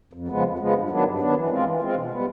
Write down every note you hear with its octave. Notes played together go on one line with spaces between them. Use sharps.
F2
C#3 F3 G#3 B3
F2
C#3 F3 G#3 B3
G2
D#3 F#3 B3 D4
G2
D#3 F#3 B3 D4
E3
G#3 C4 F4
E3
G#3 C4 F4
B2
G3 B3